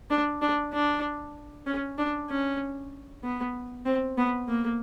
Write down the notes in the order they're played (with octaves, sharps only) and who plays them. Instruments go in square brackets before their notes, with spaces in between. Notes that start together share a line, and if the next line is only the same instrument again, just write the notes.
[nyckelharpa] D4
D4
D4
C#4
D4
C#4
B3
C4
B3
A#3